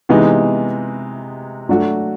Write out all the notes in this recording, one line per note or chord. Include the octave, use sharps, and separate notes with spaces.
C3 E3 G#3 B3 D#4
F#3 A3 D4 F#4